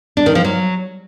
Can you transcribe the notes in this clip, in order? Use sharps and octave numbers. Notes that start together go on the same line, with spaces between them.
D4
D#3
F3
F#3